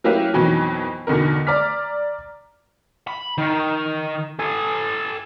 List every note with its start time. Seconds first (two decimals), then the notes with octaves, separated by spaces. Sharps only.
0.04 F#3 A#3 C#4 E4 G4 B4
0.34 F2 B2 D#3 E3 F#3
1.07 E2 B2 D3 D#3 A#4
1.47 D5 A#5 D6 F6 B6
3.07 B5
3.38 D#3
4.39 A4 G#5